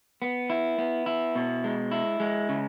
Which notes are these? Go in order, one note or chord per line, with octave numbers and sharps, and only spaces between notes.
B3
E4
B3
E4
B2
G#3
E4
G#3
C#3